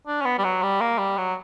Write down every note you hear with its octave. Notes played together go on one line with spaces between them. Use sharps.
D4
C#4
B3
G3
F#3
G3
A#3
G3
F#3